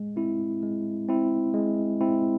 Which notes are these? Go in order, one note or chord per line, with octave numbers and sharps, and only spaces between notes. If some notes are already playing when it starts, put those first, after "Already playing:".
Already playing: G#3
C4 E4
G#3
C4 E4
G#3
C4 E4